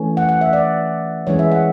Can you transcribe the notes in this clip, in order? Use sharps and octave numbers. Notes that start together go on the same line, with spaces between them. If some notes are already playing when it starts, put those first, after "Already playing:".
Already playing: E3 A3 C#4
F#5
F#5
E5
D5
E3 G#3 C#4 C#5
E5
F#5